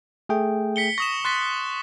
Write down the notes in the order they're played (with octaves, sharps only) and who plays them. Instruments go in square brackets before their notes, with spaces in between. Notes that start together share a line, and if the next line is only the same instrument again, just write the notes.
[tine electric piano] A3 G#4 G5
[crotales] B6 C#7 G7
[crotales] C#6 D#6 E7 [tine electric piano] A#6
[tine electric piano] C6 [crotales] F#6 A6 B6